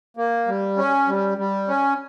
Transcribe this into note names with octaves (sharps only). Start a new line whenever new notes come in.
A#3
G3
C#4
G3
G3
C#4